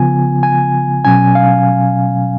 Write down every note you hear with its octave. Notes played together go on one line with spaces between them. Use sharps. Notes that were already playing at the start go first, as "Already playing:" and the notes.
Already playing: C#3 F3 B3 F4 G#5
G#5
B2 F#3 C#4 G#5
F5